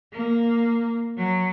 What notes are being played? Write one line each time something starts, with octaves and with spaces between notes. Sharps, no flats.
A#3
F#3